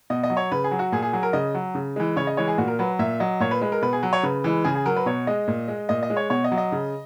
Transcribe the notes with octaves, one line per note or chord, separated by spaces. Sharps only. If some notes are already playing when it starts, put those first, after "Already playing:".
B2 D#5
D#5
F#3
C#5
C#3 B4
G#4
F#3
F#4
A#2 G#4
G#4
F#3 G#4
A#4
C#3 D#5
F#3
C#3
E3 G#3
C#3 C#5
D#5
E3 G#3 C#5
G#4
A#2 F#4
A#4
F#3 B4
A#2 E5
F#3 D#5
A#2 C#5
B4
G#3 B4
A#4
B2 B4
G#4
F#3
C#5
C#3 B4
E3 G#3
C#3 G#4
G#4
F#3 A#4
B4
B2 C#5
G#3 D#5
A#2
G#3
A#2 D#5
D#5
G#3
C#5
B2 C#5
D#5
F#3
D#5
C#3